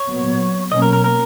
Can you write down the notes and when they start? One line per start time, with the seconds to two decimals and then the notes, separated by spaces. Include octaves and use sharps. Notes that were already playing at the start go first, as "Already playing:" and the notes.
Already playing: C#5
0.08 A#2 F#3 B3
0.72 B2 F#3 A#3 C#4 D#5
0.82 A#4
0.93 A#4
1.04 A#4